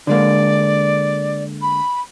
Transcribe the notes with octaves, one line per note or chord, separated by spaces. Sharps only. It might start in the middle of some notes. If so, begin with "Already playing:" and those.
D3 G#3 A#3 D5
B5